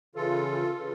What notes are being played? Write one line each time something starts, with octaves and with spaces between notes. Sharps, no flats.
C#3 E3 F4 A4
C#3 E3